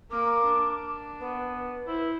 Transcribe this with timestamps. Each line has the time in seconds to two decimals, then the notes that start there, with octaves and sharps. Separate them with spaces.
0.10 A#3 A#4 D6
0.45 D4
1.20 B3 B4
1.87 E4 C5